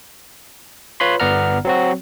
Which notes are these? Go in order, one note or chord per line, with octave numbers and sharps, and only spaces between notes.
F4 B4 C#5 B5 C6
G1 B3 D5 F#5 A#5 F6
F#3 C4 F#4